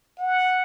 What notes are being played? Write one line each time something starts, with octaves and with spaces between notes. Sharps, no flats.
F#5